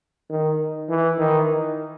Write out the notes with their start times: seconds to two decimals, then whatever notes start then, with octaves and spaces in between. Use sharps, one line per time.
0.30 D#3
0.89 E3
1.18 D#3